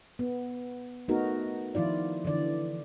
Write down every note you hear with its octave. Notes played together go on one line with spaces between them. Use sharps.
B3
A3 B3 D#4 F#4 A#4
D#3 F3 E4 F4 D5
D3 E3 D5